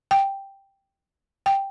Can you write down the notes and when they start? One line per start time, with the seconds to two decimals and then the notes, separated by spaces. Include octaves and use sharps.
0.11 G5
1.46 G5